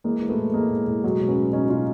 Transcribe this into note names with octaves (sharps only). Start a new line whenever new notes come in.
E3 G#3 A#3
E3
A3 B3
A2
E3 G#3 A#3
A2
A2
B2 F#3 G#3
B2
B3 C#4
B2
B2 C#4 D#4
B2 D#4 F4